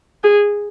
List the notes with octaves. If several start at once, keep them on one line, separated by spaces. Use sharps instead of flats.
G#4